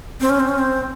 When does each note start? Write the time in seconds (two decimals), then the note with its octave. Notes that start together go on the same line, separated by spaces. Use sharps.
0.21 C4
0.30 C#4
0.40 C4
0.48 C#4
0.59 C4